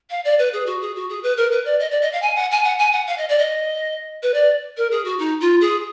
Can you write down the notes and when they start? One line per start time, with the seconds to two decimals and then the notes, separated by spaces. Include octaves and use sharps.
0.10 F5
0.24 D5
0.39 B4
0.53 G#4
0.66 F#4
0.81 G#4
0.95 F#4
1.09 G#4
1.23 B4
1.37 A#4
1.51 B4
1.65 D5
1.79 D#5
1.91 D5
2.01 D#5
2.12 F5
2.22 G#5
2.36 F#5
2.51 G#5
2.64 F#5
2.79 G#5
2.92 F#5
3.07 F5
3.18 D#5
3.29 D5
3.38 D#5
4.22 B4
4.34 D5
4.77 A#4
4.91 G#4
5.04 F#4
5.19 D#4
5.40 F4
5.60 G#4